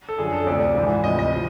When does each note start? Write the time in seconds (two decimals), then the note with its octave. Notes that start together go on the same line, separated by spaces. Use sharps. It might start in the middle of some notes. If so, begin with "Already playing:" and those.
0.09 A4
0.18 F#2 D3 F3 G#4
0.33 A4
0.47 D2 C3 F3 D5
0.75 G#2 E3
1.04 D2 C3 F3 D#5
1.19 D#5
1.32 F3